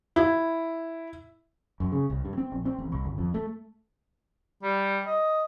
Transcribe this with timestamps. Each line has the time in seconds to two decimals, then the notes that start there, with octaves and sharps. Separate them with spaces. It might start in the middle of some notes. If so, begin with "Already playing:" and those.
0.16 E4
1.80 F#2
1.92 C#3
2.10 C2
2.25 G2
2.38 C4
2.52 A#1
2.65 C4
2.79 A1
2.92 C2
3.05 G1
3.18 F2
3.34 A3
4.63 G3
5.07 D#5